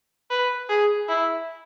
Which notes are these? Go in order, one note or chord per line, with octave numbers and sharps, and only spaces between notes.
B4
G#4
E4